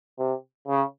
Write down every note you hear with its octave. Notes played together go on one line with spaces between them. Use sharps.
C3
C#3